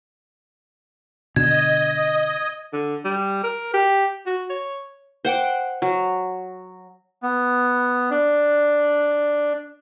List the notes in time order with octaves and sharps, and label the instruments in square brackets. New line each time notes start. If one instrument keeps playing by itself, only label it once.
[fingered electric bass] B2 D3 [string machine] D#5 [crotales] G#6
[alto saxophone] D3
G3
A#4
G4
F#4
C#5
[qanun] C5 F#5 G5 D6
F#3
[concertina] B3
D4